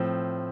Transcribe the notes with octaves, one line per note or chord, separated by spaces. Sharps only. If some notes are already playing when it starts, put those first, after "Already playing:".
Already playing: A2 F3 C4